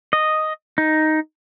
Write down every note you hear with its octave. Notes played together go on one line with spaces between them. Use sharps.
D#5
D#4